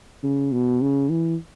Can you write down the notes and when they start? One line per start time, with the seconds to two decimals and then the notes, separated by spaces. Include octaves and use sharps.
0.23 C#3
0.52 B2
0.81 C#3
1.10 E3